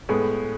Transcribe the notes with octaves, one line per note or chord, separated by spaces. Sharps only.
A2 G#3 B3 A4